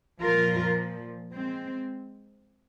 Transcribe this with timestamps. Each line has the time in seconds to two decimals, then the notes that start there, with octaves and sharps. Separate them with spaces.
0.21 A#2 F3 F4 A#4
1.33 G#3 C4